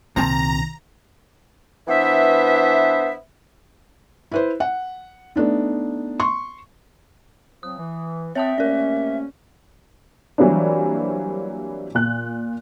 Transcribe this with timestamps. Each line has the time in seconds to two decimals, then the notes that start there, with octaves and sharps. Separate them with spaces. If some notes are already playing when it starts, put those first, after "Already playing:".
0.16 C2 A#2 D#3 C4 A5 A#5
1.88 E3 B3 D4 C5 E5
4.32 E4 B4 C5
4.60 F#5
5.36 A3 B3 D4 D#4
6.20 C6 C#6
7.63 F3 F#3 C4 D#6
7.78 E3
8.35 C4 C#5 E5 F#5 G5 A5 D#6
8.58 C3 A3 A#3 C#4 A#4 D5
10.38 E3 F#3 G3 A#3 C4 D4
11.95 A#2 F#6